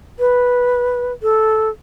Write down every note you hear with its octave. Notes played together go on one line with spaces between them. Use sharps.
B4
A4